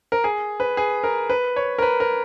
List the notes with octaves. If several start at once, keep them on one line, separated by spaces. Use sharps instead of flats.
A#4
G#4
B4
G#4
A#4
B4
C#5
A#4
B4
A#4